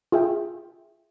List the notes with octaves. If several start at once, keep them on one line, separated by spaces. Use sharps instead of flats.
F4 G#4 E5 G5